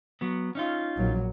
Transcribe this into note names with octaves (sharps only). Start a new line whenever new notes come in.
F#3 B3
C#4 D#4 F4
A#1 F#3